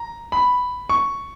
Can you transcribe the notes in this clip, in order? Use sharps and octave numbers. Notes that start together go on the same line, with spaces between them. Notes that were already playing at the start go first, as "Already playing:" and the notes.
Already playing: A#5
B5
C#6